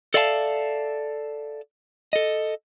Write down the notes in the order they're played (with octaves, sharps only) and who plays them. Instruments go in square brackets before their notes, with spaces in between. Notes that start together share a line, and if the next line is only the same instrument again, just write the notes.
[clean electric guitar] A4 D5 E5 F5 G5 A5
A4 D#5